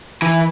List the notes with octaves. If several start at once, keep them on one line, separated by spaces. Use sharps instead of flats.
E3